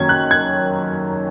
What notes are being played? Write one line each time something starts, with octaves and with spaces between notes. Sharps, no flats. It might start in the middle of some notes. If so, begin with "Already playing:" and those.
Already playing: F#2 D#3 A#3 C#4 G#6
F#6
G#6